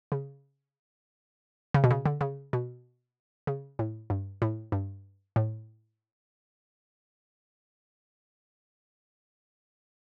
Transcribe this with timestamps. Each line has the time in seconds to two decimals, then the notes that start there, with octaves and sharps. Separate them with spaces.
0.12 C#3
1.74 C#3
1.84 B2
1.90 C#3
2.06 D3
2.21 C#3
2.53 B2
3.47 C#3
3.79 A2
4.10 G2
4.42 A2
4.72 G2
5.36 A2